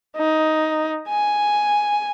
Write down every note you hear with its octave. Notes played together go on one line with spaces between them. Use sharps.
D#4
G#5